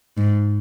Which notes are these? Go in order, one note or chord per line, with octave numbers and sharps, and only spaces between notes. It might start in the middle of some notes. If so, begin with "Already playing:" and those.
G#2